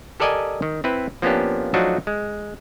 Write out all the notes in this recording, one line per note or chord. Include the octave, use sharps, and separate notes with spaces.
G4 A4 A#4 D5 D#5 G#5
D#3
C4 E4 B4
F3 A#3 B3 C#4 D4 G4
F3 F#3 A3 D4 D#4 F#4
G#3